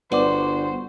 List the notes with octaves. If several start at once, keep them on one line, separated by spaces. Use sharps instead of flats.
G1 F#4 B4 C5 D5 D6